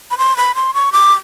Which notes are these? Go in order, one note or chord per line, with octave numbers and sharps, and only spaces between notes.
B5
C6
B5
C6
C#6
D6